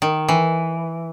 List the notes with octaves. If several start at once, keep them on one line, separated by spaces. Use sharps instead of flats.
D#3
E3